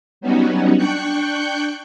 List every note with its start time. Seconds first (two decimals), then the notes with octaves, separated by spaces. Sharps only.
0.21 F#3 G3 B3 C#4 D#4 F#4
0.77 D4 G5 C#6 F#6 G6 C#7